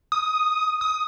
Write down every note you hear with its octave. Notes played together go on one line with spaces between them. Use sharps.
D#6
D#6